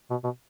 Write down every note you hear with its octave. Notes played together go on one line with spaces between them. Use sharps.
B2
B2